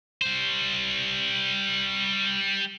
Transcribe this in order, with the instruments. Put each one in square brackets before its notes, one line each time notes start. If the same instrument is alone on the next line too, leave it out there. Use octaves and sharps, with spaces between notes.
[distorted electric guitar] G3 C5